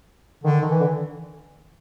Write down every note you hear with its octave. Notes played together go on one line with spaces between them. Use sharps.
D3 D#3
D#3
E3
D3